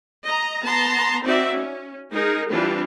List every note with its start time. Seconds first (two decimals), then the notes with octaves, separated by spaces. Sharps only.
0.24 D#5 A#5
0.63 B3 A5 A#5 C6
1.23 C4 D#4 F#4 D5 E5
1.54 C#4
2.12 G#3 D#4 G#4 A#4
2.50 E3 G3 C4 D4 F4